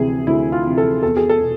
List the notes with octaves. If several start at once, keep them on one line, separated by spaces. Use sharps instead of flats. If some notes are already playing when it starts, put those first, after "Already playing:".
Already playing: D2 C3 E3 G#4
D2 E4
F4
C3 E3
A4
E2 A4
G#4
A4
B2